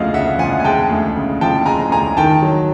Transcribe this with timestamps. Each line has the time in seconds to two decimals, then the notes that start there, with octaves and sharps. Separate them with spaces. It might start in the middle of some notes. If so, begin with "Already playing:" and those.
Already playing: D2 C#3 F3 G#3 D#5 F5
0.13 C#3 E5 F#5
0.38 F3 F#5 G#5
0.60 G#5
0.64 G#3 G5 A5
0.90 D2
1.15 C#3
1.41 F3 G5 A5
1.66 G#3 G#5 A#5
1.91 D2 G#5 A#5
2.17 D#3 G5 A5
2.42 F#3